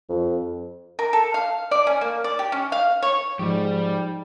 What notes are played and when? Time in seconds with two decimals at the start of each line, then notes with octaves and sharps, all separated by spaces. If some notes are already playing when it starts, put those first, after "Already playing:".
0.09 F2
0.99 A#4
1.13 A4
1.34 F5
1.71 D5
1.87 C#4
2.01 A#3
2.24 D5
2.39 G4
2.52 C#4
2.72 F5
3.02 C#5
3.39 G#2 F3 G3 G4